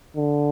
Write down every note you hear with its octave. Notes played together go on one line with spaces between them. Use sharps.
D3